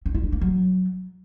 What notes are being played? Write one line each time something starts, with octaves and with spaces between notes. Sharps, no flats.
C#4
E4
D4
A#3
F#3